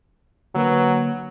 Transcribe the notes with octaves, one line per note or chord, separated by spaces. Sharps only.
D3 F#3 A#3 B4